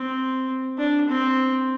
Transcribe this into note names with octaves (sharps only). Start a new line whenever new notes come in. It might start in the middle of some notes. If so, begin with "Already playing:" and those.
Already playing: C4
D4
C4